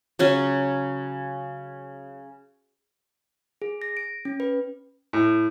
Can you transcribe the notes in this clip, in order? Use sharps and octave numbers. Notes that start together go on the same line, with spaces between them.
C#3 F#3 C#4
G#4
A#6
D7
C#4
B4
A2